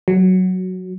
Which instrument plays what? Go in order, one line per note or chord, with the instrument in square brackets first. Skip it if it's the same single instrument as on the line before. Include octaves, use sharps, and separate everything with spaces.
[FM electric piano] F#3